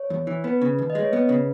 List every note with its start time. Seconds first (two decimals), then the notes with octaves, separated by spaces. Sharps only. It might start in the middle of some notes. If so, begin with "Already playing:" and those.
Already playing: C#5
0.10 E2
0.27 E3
0.44 B3 B4
0.62 C#3
0.79 D#2
0.90 D#5
0.95 G#3
1.01 C#5
1.12 B3 B4
1.29 C#3